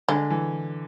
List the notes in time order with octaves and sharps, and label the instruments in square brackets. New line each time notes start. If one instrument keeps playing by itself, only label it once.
[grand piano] D3 [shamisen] G#3
[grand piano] E3